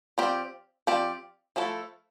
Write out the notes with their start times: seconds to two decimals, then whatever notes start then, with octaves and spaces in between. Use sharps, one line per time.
0.18 F3 C4 G4 D5
0.87 F3 C4 G4 D5
1.56 F3 A3 E4 A4